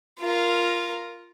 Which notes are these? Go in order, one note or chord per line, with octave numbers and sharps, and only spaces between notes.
F4 A#4